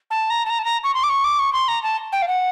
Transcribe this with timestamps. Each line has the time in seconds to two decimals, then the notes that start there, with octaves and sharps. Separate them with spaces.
0.11 A5
0.30 A#5
0.46 A5
0.50 A#5
0.59 A5
0.65 A#5
0.84 C#6
0.94 C6
1.03 D6
1.09 C#6
1.24 D6
1.39 C#6
1.53 C6
1.68 A#5
1.83 A5
2.12 G5
2.22 F5
2.28 F#5